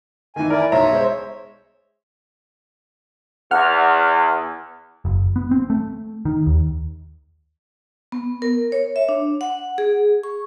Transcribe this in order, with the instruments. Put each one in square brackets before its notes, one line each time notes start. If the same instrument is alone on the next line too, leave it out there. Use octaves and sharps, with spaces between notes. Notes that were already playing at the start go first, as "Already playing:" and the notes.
[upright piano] D#3 E3 [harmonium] G#5
[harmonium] E4 D5 [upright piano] A#4
[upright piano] B1 A#5 C6 [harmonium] C#5 E5
[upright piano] G#3 C5
[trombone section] E2 [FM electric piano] F#5 F6
[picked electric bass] F#1
B3
C4
A3
D#3
D#2
[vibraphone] B3
A#4
C#5
E5
D4
F#5
G#4
C#6